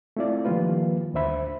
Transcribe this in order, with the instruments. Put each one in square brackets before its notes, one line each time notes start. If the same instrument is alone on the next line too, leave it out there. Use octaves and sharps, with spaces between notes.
[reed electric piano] A3 C4 E4 F4 D5
D#3 F3 G3 A#3 F4 B4
D2 D3 C5 E5 B5